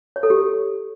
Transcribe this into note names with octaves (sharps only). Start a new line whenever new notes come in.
C#5
A4
G4